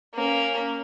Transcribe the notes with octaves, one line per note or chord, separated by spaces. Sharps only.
A#3 C#4